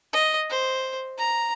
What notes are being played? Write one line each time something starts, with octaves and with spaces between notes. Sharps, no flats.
D#5
C5
A#5